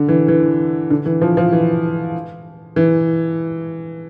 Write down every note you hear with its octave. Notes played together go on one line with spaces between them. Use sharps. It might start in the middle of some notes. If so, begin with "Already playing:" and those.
Already playing: D3
E3
E3
D3
E3
F3
F3
E3
E3